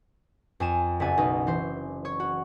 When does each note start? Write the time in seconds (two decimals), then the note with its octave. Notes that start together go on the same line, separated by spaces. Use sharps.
0.60 F2 G#5 E7
1.00 F#1 E5 F#5 G#5 A6
1.18 B1 D#4
1.47 E3 C5
2.05 C#5 C#6
2.20 F#4